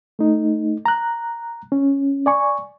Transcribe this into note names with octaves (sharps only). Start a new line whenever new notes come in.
A3 D#4
A#5 F#6
C#4
D5 G#5 C#6